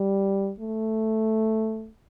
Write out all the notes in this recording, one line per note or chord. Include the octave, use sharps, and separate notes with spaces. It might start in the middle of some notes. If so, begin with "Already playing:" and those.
Already playing: G3
A3